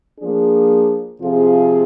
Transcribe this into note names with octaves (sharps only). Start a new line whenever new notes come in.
F3 A#3 D4 G#4
C3 F3 C4 F4 G#4